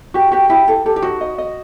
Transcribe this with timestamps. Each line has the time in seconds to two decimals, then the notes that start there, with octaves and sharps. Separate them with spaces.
0.14 F#4 G4
0.32 F#4 G4
0.50 E4 G4
0.68 A4
0.86 G4 A4
0.96 G4
1.02 D#4 F#4
1.21 D#5
1.38 D#5